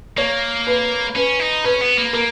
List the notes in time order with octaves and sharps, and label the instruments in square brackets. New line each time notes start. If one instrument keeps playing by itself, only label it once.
[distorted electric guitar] A#3 [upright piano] C#5
[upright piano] B4
[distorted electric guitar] C#4 [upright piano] B4
[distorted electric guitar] D#4
[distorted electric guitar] C#4 [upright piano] B4
[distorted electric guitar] B3
A#3
[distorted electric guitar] A#3 [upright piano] A#4